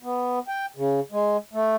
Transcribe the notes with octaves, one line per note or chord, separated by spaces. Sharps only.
B3
G5
C#3
G#3
A3